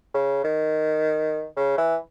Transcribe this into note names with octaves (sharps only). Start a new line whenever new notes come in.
C#3
D#3
C#3
E3